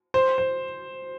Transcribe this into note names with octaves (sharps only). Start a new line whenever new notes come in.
C5
C5